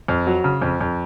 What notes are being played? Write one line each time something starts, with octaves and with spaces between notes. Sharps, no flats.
F2
F#3
C#3
F2
F2